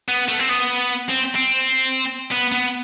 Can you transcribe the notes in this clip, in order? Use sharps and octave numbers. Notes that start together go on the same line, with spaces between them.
B3
A3
C4
B3
C4
C4
B3
B3